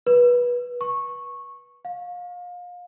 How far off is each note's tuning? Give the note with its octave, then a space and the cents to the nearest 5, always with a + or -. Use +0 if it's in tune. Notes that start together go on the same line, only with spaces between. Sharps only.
B4 -20
C#6 -15
F5 +30